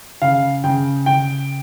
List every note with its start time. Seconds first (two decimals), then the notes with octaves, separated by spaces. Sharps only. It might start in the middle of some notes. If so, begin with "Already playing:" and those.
0.22 C#3 F5
0.64 C#3 G5
1.06 C#3 G5